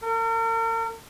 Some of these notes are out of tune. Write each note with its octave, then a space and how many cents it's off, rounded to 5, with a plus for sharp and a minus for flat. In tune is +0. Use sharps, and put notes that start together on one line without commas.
A#4 -40